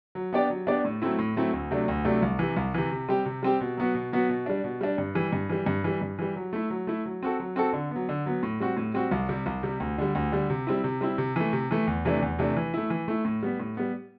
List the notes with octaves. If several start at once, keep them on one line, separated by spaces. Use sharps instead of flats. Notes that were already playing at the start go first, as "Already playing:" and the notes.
F#3
B3 D4 G4 D5
F#3
B3 D4 G4 D5
A2
F#3 A3 C4 E4
A2
F#3 A3 C4 E4
D2
C3 F#3 A3 D4
D2
C3 F#3 A3 D4
C2
C3 E3
C2
C3 E3
C3
G3 C4 G4
C3
G3 C4 G4
B2
F#3 B3 F#4
B2
F#3 B3 F#4
B2
G3 D4
B2
G3 D4
G2
E3 G3
G2
E3 G3
G2
E3 G3
G2
E3 G3
F#3
A3 E4
F#3
A3 E4
F#3
C4 F#4 A4
F#3
C4 F#4 A4
D3
F#3 B3
D3
F#3 B3
A2
G3 C4 F#4
A2
G3 C4 F#4
C2
C3 G3
C2
C3 G3
D2
D3 G3
D2
D3 G3
C3
G3 C4 E4
C3
G3 C4 E4
C3
E3 A3
C3
E3 A3
E2
C3 E3 A3 D4
E2
C3 E3 A3 D4
E3
A3 E4
E3
A3 E4
A2
G3 B3
A2
G3 B3